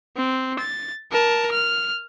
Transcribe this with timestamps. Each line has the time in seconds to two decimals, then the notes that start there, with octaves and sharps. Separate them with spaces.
0.17 C4
0.59 A6
1.12 A#4 A5
1.52 F6